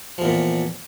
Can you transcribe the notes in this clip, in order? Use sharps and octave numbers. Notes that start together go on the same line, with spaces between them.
E2 A#2 F3